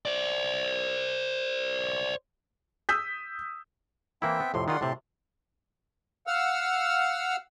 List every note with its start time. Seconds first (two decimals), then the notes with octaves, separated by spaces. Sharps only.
0.05 C5 D5
2.89 D#6 E6 G6 B6
4.22 E3 A#3 C4 E4 E5 G5
4.40 B3
4.54 F2 A2 C3 C6
4.68 D#3 F4 G#4 D5 F#5 C6
4.81 A2 C3 G4 A5 C6
6.27 F5 F#5 E6 F6